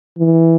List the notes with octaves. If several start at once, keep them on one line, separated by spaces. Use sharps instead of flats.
E3